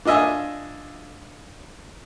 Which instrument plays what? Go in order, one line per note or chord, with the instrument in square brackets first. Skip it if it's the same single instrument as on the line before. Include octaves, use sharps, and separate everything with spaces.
[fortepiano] D4 F4 D#5 E5 G#5